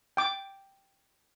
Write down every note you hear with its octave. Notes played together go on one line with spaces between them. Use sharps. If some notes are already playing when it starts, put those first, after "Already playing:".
G5 D6